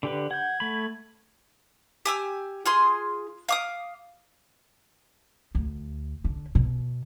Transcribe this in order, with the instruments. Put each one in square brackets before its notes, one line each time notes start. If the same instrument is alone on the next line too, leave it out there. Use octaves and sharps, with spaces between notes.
[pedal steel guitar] D3 G4 B4
[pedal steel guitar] F#5 G6 [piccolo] G#6
[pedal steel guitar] A3 B5
[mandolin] G4 G#5 E6
F4 G#4 C6
F5 D6 D#6
[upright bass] D2
D3
B2